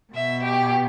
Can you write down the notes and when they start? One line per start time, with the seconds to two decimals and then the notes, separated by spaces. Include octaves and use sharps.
0.13 B2 E5
0.44 G4